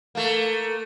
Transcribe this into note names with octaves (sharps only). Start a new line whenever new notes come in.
A3 A#3